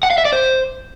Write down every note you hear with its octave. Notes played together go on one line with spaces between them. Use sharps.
F#5
F5
E5
D5
C5